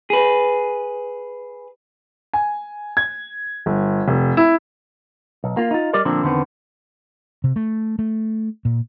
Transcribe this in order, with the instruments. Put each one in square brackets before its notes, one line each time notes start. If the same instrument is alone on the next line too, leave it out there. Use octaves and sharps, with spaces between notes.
[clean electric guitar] G#4 B4
[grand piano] G#5
G#6
G1
F1
E4
[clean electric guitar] B1
A#3 F4
D#4 F4
G3 G4 A#4 D5 D#5
A#2 D3 F3 A#3 C4 D4
E2 D3 D#3 G#3 B3 C4
[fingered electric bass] C3
A3
A3
A#2